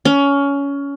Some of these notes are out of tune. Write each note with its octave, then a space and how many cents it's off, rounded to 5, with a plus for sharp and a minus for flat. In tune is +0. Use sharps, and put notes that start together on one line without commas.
C#4 +20